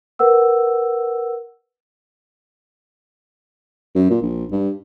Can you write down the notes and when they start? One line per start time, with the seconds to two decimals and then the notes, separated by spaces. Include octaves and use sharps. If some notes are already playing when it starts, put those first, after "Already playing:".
0.19 A#4 B4 F#5 E6
3.95 F#2
4.11 A#2
4.22 A#1
4.52 G2